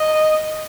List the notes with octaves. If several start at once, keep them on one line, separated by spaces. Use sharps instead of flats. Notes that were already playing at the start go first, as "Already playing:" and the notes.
Already playing: D#5